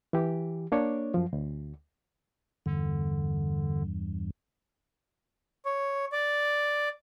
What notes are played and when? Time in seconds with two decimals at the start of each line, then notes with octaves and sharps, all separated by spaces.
0.13 E3 G4
0.72 A#3 D4 C#5
1.14 F#2 F3
1.33 D2
2.66 E2 G2 D3
5.65 C#5
6.12 D5